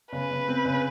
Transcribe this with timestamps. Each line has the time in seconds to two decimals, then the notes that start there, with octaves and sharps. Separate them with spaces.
0.12 C#3 B4
0.31 C#3
0.48 C4
0.65 C#3